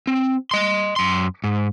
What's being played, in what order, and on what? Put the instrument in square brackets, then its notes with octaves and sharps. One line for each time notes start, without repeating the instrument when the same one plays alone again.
[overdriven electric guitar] C4
D#5 C6
F#2 C6
G#2